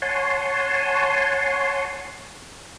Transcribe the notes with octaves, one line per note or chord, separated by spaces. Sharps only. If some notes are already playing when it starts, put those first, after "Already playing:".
C#5 F#5 G#5 A5 C6